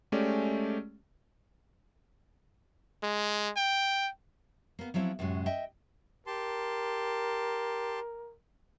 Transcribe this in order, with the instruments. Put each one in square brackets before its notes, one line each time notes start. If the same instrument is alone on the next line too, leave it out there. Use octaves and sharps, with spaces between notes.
[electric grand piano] G#3 A3 C#4 G4 D5
[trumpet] G#3
G5
[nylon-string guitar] A#3 B3
F3 F#3 C4 E4
F#2 A2 C3 G#3 F#4
D#5 E5 G5
[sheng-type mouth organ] G4 A5 C6 [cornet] A#4